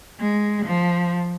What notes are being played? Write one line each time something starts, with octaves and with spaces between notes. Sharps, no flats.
G#3
F3